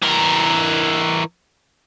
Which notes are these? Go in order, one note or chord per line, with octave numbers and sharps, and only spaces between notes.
E3 A#4